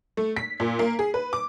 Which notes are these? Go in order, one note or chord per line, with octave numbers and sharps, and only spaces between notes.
A3
B6
A#2
A#3
G#4
B4
D6